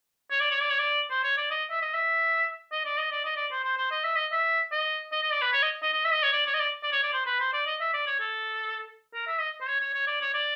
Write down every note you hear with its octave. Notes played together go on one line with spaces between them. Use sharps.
C#5
D5
C#5
D5
C#5
D5
C5
C#5
D5
D#5
E5
D#5
E5
D#5
D5
D#5
D5
D#5
D5
C5
C5
C5
D#5
E5
D#5
E5
D#5
D#5
D#5
D5
B4
C#5
D#5
D#5
D#5
E5
D#5
C#5
D5
C#5
D#5
D5
D5
C#5
D5
C5
B4
C5
D5
D#5
E5
D5
C#5
A4
A#4
E5
D#5
C5
C#5
C#5
C#5
D5
C#5
D5